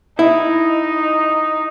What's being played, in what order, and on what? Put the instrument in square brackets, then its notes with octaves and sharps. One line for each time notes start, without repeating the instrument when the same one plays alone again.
[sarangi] D#4 [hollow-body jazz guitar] E4